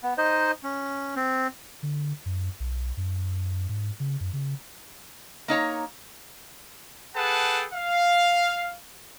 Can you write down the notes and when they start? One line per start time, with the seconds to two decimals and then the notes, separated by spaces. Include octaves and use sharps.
0.03 B3
0.18 D#4 C5 D#5
0.63 C#4
1.16 C4
1.83 D3
2.26 F#2
2.60 B1
2.97 F#2
3.69 G#2
4.00 C#3
4.21 F#2
4.33 C#3
5.48 A#3 D#4 C#5 A#5
7.16 G#4 A4 B4 F#5 G5 A5
7.74 F5